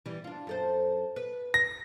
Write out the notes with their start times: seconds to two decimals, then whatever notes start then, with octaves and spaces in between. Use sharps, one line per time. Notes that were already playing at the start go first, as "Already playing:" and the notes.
0.06 E3 G3
0.24 D4 F4
0.47 F#2 A4 C5
1.16 B4
1.54 A#6